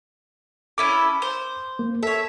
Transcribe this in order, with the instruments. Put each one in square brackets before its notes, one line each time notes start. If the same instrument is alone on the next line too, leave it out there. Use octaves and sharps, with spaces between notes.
[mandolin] C#4 E4 A4 [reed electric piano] D6
[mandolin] C5
[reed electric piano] A#3
[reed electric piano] A4 [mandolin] C#5 E5